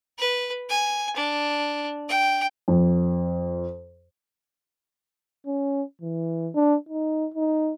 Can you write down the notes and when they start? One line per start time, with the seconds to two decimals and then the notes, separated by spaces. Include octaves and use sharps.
0.18 B4
0.69 G#5
1.16 D4
2.09 G5
2.68 F2
5.46 C#4
6.02 E3
6.55 D4
6.89 D#4
7.34 D#4